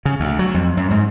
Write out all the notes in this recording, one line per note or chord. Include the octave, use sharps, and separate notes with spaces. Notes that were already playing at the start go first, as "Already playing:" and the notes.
C#3
D2
F#3
F2
F#2
G#2